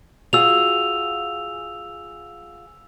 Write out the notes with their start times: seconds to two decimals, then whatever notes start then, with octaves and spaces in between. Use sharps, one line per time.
0.33 F4 F#4 G#4 E6 F7